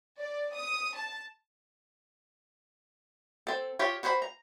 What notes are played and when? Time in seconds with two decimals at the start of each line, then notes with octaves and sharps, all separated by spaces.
0.20 D5
0.55 D#6
0.96 A5
3.47 C4 A4
3.79 F4 G4 C#5
4.03 F#4 B4 C5 G5 B5
4.22 A#5